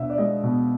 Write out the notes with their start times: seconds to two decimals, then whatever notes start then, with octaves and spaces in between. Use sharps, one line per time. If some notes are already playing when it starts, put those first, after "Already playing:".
Already playing: B2 B3 D4 E5
0.10 D5
0.18 G#3 D#5
0.44 B2